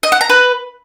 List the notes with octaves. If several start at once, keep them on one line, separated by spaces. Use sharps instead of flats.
D#5
F#5
A#5
B4